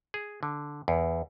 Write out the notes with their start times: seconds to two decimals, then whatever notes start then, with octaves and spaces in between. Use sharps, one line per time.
0.14 G#4
0.43 D3
0.88 E2